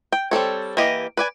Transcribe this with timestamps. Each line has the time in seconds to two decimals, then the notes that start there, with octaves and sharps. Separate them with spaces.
0.12 G5
0.31 G3 C4 A4 C#5
0.77 E3 A#3 G4 D#5
1.17 B4 D5 G#5